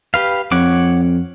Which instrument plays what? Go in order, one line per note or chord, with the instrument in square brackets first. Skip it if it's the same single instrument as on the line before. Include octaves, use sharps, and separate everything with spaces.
[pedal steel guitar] G4 B4 F5
[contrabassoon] F2 [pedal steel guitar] C#5 F#5 D6